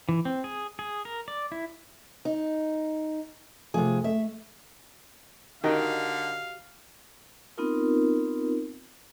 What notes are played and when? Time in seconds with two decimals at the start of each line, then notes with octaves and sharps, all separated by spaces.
0.09 E3
0.25 C4
0.44 G#4
0.79 G#4
1.05 A#4
1.28 D5
1.52 E4
2.25 D#4
3.74 C3 F3 A3 G#4
4.04 A3 E5
5.64 D3 D#3 F#4 G4 D#5 F5
7.58 B3 C4 D#4 F4 A#4